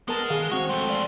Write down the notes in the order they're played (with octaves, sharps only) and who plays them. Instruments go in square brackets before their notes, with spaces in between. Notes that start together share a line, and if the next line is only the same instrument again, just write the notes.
[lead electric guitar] G#3 [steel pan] B3 A#4 A5
[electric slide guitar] D#3 [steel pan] G#4 F5
[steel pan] C4 F#5 [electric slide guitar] F#4 [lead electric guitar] C#5
[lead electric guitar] F3 A3 [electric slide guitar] G#3 A4 [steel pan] G5
[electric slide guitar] D5 [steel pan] F5